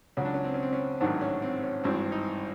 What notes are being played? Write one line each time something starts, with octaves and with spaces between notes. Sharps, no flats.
C#2 C#3 F#3 C#4
D4
C#4
C4
C#4
C4
C#4
A1 G#2 D#3 F#3 D4
C#4
C4
C#4
G#1 G2 E3 C4
D#4